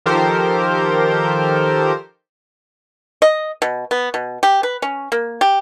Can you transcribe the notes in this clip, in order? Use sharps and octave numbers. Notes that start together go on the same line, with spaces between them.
D#3 F3 G4 A4 A#4 C5
D#5
B2
B3
B2
G4
B4
C#4
A#3
G4